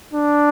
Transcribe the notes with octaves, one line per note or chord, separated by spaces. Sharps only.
D4